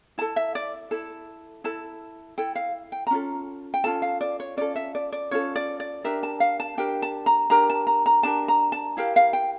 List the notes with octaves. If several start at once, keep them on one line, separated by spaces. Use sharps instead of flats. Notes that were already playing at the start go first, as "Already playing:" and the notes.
E4 A4 A5
E5
D5
E4 A4
E4 A4 A5
E4 A4 G5
F5
G5
A#5
C#4 F4 A4
G5
C#4 F4 A4 A5
F5
D5
C#5
C#4 F4 A4 D5
E5
D5
D5
C#4 F4 A4 C#5
D5
D5
D4 G4 A#4 E5
A5
F5
A5
D4 G4 A#4 G5
A5
A#5
D4 G4 A#4 A#5
A5
A#5
A#5
D4 G4 A#4 A5
A#5
A5
E4 G4 A#4 F5
F5
G5